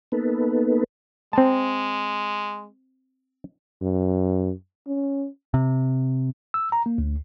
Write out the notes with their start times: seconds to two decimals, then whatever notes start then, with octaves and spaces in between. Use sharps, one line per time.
0.12 A#3 B3 D#4 A4 B4
1.33 G#3 C4 A5
3.82 F#2
4.87 C#4
5.54 C3
6.54 E6
6.72 A#5
6.86 A#3
6.98 D2